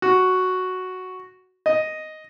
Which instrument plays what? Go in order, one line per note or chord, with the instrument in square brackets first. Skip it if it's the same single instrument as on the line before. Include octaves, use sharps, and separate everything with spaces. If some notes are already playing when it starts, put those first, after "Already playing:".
[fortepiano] F#4
D#5